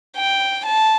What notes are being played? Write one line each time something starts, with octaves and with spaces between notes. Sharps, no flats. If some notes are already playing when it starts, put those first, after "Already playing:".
G5
A5